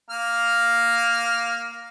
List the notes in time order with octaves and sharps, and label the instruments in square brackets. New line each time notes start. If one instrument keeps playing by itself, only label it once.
[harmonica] A#3 F6